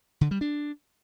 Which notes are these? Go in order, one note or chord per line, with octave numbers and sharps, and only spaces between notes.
D3
G3
D4